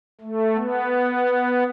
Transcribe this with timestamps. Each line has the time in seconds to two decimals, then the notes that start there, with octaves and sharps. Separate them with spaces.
0.21 A3
0.56 B3